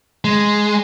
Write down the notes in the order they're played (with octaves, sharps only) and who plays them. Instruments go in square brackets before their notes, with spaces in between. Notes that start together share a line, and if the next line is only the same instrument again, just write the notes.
[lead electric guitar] G#3